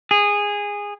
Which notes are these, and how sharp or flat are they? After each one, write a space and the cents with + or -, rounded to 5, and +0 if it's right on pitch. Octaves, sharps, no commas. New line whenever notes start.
G#4 -15